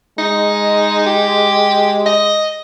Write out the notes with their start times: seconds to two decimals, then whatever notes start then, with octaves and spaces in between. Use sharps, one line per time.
0.19 G#3 D#4
1.06 G4
2.06 D#5